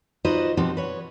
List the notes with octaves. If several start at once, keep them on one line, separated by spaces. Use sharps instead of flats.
D#4 F4 F#4 B4 C5 D#5
B2 F3 C4 G4 F#5
B4 C#5